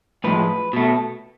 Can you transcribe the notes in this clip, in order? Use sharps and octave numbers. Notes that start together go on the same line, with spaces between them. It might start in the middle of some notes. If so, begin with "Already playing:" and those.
A2 F3 G#3 B4
B2 A3